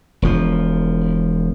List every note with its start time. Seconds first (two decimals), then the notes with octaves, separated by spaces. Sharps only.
0.22 E1 F3